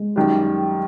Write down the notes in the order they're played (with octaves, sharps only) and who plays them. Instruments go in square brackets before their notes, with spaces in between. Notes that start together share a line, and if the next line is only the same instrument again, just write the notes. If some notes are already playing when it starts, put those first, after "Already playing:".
Already playing: [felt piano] G#3
[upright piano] F#2 D#3 G3